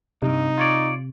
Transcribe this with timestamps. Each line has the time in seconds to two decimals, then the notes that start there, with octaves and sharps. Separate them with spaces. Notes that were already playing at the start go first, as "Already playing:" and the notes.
0.23 B1 G2 C3 D#4
0.58 F4 C#5 D5